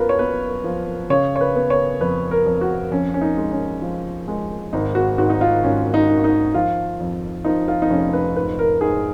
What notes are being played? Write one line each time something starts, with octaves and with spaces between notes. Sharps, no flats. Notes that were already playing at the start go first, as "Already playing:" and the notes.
Already playing: F#2 B3 F4 A#4 B4
C#5
B3 B4
F3
C#3 C#5
C#5
B4
B3
C#5
F2 B4
A#4
F2
F#4
F2 C#4
C#4
D#4
G#3
C#4
F3
G#3
G#1 D#4
F#4
G#2 F#4
D#4
F4
G#1 C#4
D#4
D#3
D#4
F3 F4
F2
F3 D#4
F4
D#4
F1 C#4
B4
G#2 B4
A#4
G#2 G#4